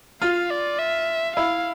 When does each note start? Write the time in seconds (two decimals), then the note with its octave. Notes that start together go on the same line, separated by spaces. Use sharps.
0.21 F4 F5
0.50 D5
0.79 E5
1.36 E4 F5